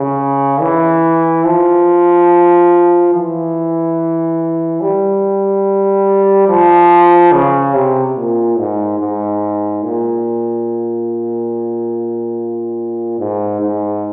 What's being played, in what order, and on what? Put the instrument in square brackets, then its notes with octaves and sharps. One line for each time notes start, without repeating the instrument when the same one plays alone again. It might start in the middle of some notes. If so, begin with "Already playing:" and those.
Already playing: [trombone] C#3
E3
F3
E3
G3
F3
C#3
C3
A#2
G#2
G#2
A#2
G#2
G#2